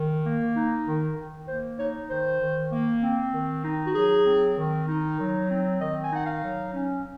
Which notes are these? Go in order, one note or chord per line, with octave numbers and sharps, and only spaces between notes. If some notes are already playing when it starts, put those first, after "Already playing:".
Already playing: D#3
A#3
D#4
D#3
D#3
A#3 C5
D#4 C#5
D#3 C5
D#3
A#3
C4
D#3
D#4
F#4
F#3 G#4
C4
D#3
D#4
F#3
C4
D#3 D#5
G#5
D#4 F#5
F5
F#3
C#4